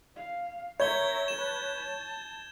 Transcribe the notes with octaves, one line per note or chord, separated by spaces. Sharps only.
F5
A#4 C#5 E5 G6 G#6 G7
B4 A5 E7
A5